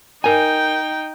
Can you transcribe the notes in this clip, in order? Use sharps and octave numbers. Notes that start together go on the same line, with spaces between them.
D#4 A#4 G5 G#5